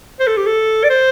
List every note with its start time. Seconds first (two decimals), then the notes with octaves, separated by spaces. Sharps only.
0.20 C5
0.27 A4
0.37 G4
0.46 A4
0.84 D5
0.90 C5